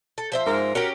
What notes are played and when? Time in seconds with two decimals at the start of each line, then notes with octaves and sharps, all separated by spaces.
0.18 A4
0.32 F3 C5 E5
0.47 G#2 A#4
0.75 C#4 F#4 G4 A#4